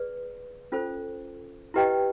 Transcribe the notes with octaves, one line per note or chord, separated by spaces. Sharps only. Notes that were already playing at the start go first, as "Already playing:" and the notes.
Already playing: G#4 B4 D5
C#4 F4 A4 C5
E4 G4 B4 D#5 G5